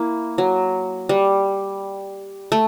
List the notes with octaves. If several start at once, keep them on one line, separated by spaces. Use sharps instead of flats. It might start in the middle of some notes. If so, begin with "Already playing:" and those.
Already playing: A#3 E4
F#3
G3
A3